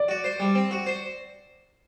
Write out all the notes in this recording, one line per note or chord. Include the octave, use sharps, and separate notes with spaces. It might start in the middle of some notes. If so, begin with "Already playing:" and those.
Already playing: D5
F#4
C5
G3
C4
F#4
C5